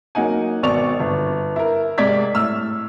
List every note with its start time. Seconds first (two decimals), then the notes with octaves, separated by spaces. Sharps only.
0.15 F#3 A#3 D#4 F#5 G#5
0.63 G#1 B2 D5 C#6 F7
1.00 G1
1.56 E4 A#4
1.98 G#2 C3 D5 G#6 B6
2.34 A2 E6 F6